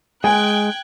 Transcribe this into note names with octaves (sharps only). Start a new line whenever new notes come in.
G#3 G5 G#5 F#6 G#6